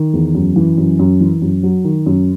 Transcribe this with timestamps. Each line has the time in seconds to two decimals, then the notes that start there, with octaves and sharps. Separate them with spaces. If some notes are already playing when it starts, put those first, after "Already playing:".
Already playing: D#3
0.13 E2
0.35 F#2
0.56 E3
0.78 F#2
0.99 F#2
1.21 E3
1.42 F#2
1.63 F#3
1.84 D#3
2.06 F#2